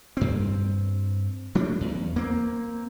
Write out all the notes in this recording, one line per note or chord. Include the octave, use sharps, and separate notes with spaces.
G2 C4
F#3 A3 C#4 D4
E2
A#3 C4